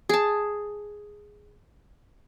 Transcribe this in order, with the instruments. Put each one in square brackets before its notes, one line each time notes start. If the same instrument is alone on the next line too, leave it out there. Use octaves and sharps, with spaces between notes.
[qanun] G#4 A5